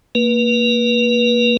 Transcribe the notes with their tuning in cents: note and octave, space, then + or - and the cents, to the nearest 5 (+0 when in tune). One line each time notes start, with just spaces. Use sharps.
A#3 -15 B4 -30